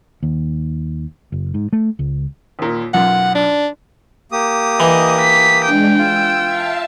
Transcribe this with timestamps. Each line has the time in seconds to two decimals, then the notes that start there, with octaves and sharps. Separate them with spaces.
0.23 D#2
1.32 F#1
1.54 G#2
1.73 A3
1.99 C#2
2.59 D#2 A#2
2.94 B1 F#2 F4 F#5
3.35 D4
4.32 A#3 G4 D#6
4.80 E3 D#5
5.21 B6
5.65 G#3 D4 G5
5.99 F4 E6
6.45 E5 F5 A5